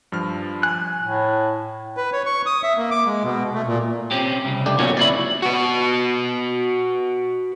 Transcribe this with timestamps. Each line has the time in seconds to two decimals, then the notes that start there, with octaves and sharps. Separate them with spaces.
0.12 G2 F3 F6
0.63 G#5 F#6
1.03 A2
1.97 B4
2.13 C#5
2.26 C#6
2.46 D#6
2.63 E5
2.77 A#3
2.91 D6
3.06 G#3
3.23 B2
3.54 A3
3.67 A#2
4.11 C4 C#4 G4
4.45 C2 C#3
4.66 A3 D4 G4
4.79 B1 A#2 C#4 F#4 C#5
4.97 C#2 C4 E4 C#5 D5 B5
5.42 F#4 B4